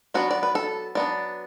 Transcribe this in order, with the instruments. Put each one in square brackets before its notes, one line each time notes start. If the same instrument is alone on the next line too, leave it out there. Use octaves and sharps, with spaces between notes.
[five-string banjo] F#3 B3 D4 F#4
D5
B4
A4
F#3 B3 D4 D5